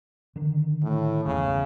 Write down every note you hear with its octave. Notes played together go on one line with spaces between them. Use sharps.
D3 D#3
A2
G1 E2 C#3 E3